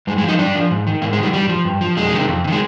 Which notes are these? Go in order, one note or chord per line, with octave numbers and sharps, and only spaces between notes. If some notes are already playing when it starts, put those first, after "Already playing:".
G2 G#3
G#3
F3
D#4
G2 D4
F3
G#2
D#3
G#2 A#3
G#3
D#3
G3
G2 G3
F3
G2
F3
F2 G#3
C3 D#3
F2
C3
D#3 G#3